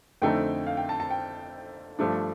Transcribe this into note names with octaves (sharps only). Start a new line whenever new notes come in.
F2 D3 A3 C4 D#4 G5
F5
G5
A5
A5
G5
G2 F3 A3 D4